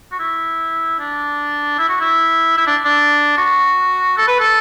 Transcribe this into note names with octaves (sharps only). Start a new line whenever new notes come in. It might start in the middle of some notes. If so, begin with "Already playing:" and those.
F#4
E4
D4
E4
F#4
E4
E4
D4
D4
F#4
A4
B4
A4